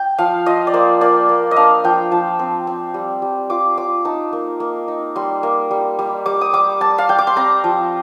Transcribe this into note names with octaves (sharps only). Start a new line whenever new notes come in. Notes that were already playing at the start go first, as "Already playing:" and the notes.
Already playing: G5
F3 F5
F4 D#5
D5
A#3 C5
A#3 D5
A#3
D#5
D4 F5
F3 G5
F3 A5
C4
C4
G3
G3
F4 D6
F4 D6
D#4 A5
A#3
A#3
D#4
G3 C6
A#3
G3
G3
G3 D6
D#6
G3 D6
G3 A5
F5
G3 G5
D6
C6
C4 A#5
F3